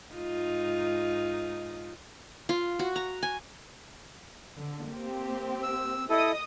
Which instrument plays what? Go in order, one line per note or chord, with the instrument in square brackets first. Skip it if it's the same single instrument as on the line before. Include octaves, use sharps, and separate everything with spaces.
[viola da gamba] G#2 D#4 F4
[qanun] F4
F#4
A#5
G#5
[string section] D3
A#3 C4 G4
[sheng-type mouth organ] E6
[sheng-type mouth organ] E4 A4 [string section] D#5 D#6